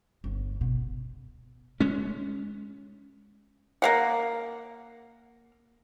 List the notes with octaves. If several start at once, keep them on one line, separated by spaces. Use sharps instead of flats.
G1
B2
G#3 C#4
A#3 F5 F#5